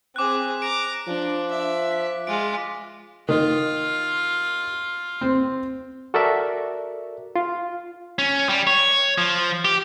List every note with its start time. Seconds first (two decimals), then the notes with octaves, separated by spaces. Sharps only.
0.16 C4 G#4 D6 F#6
0.62 A#5 D6 D7
1.07 F3 D4
1.51 E5
1.92 B6
2.27 G#3 F4 D7
3.29 D#3 F4
5.21 C4
6.14 F#4 A4 A#4 D5 E5
7.36 F4
8.19 C#4
8.49 G3
8.67 C#5
9.18 F3
9.65 G4